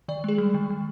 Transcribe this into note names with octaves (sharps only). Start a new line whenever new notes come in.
D#3 D5
G#3 G#4
G3
D#3
D#3